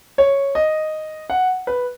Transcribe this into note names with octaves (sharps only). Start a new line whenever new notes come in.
C#5
D#5
F#5
B4